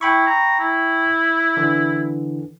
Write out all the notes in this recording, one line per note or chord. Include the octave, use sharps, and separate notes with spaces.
E4 G5 B5 C#6
A#5
E4
D3 E3